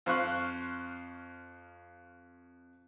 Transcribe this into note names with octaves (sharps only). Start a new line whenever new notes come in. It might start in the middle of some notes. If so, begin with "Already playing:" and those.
F2 C5 F5 C#6 F#6